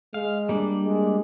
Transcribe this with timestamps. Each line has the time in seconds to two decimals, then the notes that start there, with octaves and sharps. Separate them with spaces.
0.14 G#3 F5
0.49 G3 A#3 D4
0.84 G#3